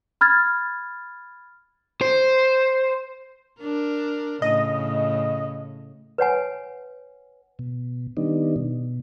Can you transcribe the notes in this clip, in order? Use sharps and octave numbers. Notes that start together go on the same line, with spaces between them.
B5 F6 G#6 A6
C5
D4 A#4
A2 C#3 D#5
B4 C#5 F#5 G#5
B2
D#3 G3 B3 D4 D#4
B2